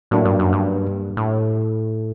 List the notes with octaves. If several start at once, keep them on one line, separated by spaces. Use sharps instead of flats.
A2 F#3 A#3 D4
G2
F#2
G2
A2